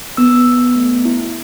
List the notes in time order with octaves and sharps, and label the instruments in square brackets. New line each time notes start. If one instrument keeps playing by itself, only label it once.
[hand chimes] B3 E6
B3
A3
E4